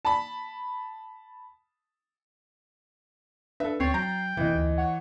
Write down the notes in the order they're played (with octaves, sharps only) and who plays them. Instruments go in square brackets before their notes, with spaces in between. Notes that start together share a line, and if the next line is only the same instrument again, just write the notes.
[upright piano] A5 B5
[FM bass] D4 [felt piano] A4 E5 [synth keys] B4
[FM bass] D2 [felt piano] C4 [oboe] C#5 [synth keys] A6 C7
[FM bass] F#3 [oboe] G5 [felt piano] A#5
[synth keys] A#1 F2 D#5 [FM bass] C3 [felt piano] E3
[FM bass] D2
[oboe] C#5 [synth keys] F#5